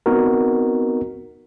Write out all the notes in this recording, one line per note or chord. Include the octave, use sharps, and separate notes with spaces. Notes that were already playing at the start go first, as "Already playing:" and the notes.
B3 C4 D#4 F#4 A#4